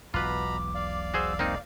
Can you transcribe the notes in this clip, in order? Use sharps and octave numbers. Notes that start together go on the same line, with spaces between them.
E1 B1 B2 F4 B4 A#5 B5 D6
D5 F5
F#4 G#4 C5 E6
A#3 C4 D#4 D#5